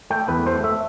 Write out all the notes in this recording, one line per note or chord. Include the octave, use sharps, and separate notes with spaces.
A3 G5
E2 B4
A3 C5
A3 E5